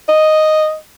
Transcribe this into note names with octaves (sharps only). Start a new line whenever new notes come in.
D#5